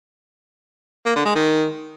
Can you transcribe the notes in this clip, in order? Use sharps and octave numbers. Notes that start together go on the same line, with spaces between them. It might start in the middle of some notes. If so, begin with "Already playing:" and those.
A#3
D3
G#3
D#3